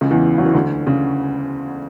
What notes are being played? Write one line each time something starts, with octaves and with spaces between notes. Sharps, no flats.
C#2 C#3
E2 E3
F#3
E3
D2 D3
C#3